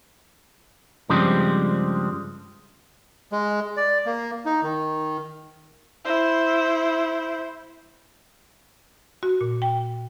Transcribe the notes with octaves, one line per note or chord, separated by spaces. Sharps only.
G2 C#3 F3 G3 G#3 C4
G#3
D5
A#3
D#4
D#3
E4 C5
F#4
A#2
G5